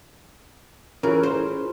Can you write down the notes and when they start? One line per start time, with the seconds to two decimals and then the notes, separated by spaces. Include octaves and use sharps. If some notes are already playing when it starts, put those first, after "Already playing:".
1.03 E3 C#4 F4 G#4 A#4
1.23 C5